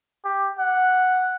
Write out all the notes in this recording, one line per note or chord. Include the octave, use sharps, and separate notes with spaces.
G4
F#5